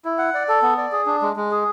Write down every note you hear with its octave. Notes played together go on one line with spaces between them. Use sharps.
E4
F#5
D5
A4
B3
D5
G#4
D4
G#3
G#3
G#4